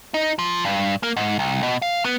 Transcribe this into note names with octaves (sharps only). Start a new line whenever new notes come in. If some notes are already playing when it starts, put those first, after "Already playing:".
D#4
F3
G2
A#3
G#2
C2
B2
F5
B3